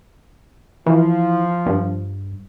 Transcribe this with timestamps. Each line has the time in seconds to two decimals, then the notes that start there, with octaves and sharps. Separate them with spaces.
0.86 E3 F3
1.66 G2